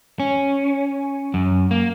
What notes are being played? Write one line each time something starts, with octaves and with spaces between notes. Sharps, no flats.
C#4
F#2
A#3